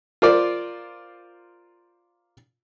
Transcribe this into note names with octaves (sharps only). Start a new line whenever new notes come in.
F4 A#4 C5 D5